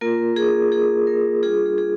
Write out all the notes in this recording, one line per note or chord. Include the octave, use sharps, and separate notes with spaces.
A#3 F4 A#4
G#4
G#4
A#4
G3 D4 F4 G#4
G#4
G#4